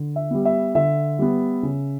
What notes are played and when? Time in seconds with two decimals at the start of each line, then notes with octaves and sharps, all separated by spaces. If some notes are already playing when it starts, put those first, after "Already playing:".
Already playing: D3
0.16 E5
0.31 G3 B3
0.45 E5
0.75 D3 E5
1.19 G3 B3
1.63 C#3